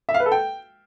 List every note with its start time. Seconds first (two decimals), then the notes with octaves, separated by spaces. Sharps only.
0.09 E5
0.14 F5
0.20 B4
0.26 A4
0.32 G5